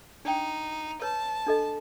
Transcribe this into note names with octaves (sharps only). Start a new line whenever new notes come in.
D4 D#4 G5
B4 C#5 A5
D4 A4 D#5